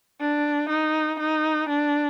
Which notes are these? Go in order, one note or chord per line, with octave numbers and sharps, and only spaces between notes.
D4
D#4
D#4
D4